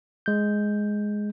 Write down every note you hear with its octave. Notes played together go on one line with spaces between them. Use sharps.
G#3 G6